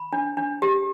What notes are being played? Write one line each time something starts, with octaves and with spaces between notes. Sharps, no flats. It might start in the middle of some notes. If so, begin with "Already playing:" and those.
Already playing: B5
D4
D4
G4